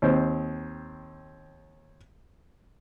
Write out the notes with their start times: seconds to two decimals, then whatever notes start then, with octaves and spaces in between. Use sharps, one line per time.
0.02 D#2 C4